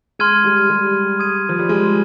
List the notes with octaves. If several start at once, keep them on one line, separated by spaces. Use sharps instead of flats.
G#3 C6 F6 G#6 D#7
G3
G3
D#6 G#6 D#7
F3
G3
G#3